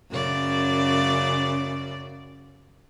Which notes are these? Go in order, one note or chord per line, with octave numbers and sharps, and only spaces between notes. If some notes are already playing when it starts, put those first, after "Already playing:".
F#2 C#3 D5